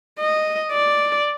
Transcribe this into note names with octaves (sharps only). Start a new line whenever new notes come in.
D#5
D5